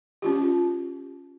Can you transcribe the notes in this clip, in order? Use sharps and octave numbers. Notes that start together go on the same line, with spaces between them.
C#4 F4 G4